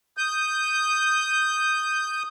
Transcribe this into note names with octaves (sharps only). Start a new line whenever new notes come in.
D#6 G6